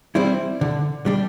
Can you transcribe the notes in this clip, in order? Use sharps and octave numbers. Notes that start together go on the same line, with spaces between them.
G3 C4 E4
D3
G3 D4